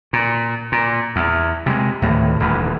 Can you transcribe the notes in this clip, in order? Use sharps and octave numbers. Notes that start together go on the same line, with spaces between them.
A#2
A#2
E2
C3 G3 G#3
D2 A2 D#3 E3
D#1 D2 E3